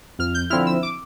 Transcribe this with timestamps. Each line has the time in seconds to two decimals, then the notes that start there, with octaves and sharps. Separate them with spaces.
0.19 F2 F6
0.34 G6
0.50 D3 F3 C4 E4 F6
0.66 E6
0.83 D6